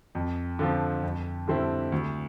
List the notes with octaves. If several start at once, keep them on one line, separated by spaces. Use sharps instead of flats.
F2
D3 F3 C4
F2
D3 G3 C4 E4
D2